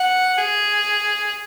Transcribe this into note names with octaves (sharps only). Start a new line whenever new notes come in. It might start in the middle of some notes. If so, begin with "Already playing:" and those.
Already playing: F#5
G#4